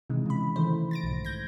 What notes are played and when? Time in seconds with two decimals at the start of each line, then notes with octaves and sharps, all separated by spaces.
0.10 C3 D#3 E3 G#3
0.26 C#3 B5
0.56 D#3 E3 A3 C5
0.91 A6 A#6 D7
1.04 B1 G#2
1.25 G6 G#6 A#6